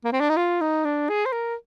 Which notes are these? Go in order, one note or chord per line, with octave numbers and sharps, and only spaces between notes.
A#3
C4
D4
D#4
F4
D#4
D4
G#4
C5
A#4